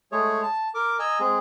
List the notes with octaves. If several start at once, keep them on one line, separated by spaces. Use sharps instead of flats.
G#3 A3 G#4 C#5
A5
A#4 D6
D#5 G#5 A#5 E6
G#3 C4 G#4